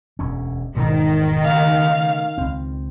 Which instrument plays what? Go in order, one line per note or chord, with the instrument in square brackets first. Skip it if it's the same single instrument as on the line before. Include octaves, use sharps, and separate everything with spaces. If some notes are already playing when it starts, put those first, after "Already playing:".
[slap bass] E1 D2 C#4
[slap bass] E1 G#2 B2 [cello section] D#3
[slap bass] C#3 A3 [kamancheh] F5
[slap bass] C#2 C4